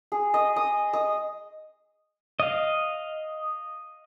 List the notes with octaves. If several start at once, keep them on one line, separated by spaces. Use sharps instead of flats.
G#4
D#5
D#6
D#5
D#5 F5